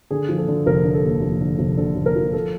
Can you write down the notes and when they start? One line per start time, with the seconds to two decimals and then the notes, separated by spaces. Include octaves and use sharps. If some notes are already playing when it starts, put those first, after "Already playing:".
0.11 D3 G#4
0.29 F3
0.38 A4
0.48 D3
0.66 F1 A#4
0.85 D3
0.94 A4
1.03 D#2
1.22 F1
1.41 D3
1.59 F1
1.77 D3 A4
1.96 F1
2.06 A#4
2.16 F3
2.33 A4